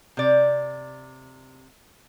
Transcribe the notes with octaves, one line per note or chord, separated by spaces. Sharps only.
C3 D5